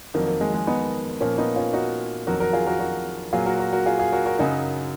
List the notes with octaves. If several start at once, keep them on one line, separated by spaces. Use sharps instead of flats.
F2 D#3 F#3 A#3
A#3
G#3
G#3
B3 D#4
A#2 F3 A#3 C#4
B3 D#4
C#4 F4
D#4 F#4
F2 D#3 F#3 F#4 A#4
F#4 A#4
F4 G#4
F#4 A#4
F#4 A#4
A#2 F#3 F4 G#4
F#4 A#4
F#4 A#4
F#4 A#4
F4 G#4
F4 G#4
F#4 A#4
F#4 A#4
F#2 C#3 F#3 D#4 F#4